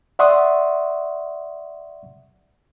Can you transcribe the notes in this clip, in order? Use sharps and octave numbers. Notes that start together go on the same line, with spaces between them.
D5 E5 F#5 C6 C#6 D#6